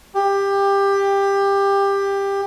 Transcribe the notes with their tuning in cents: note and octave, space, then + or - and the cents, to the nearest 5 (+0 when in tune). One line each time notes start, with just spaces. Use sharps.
G4 +20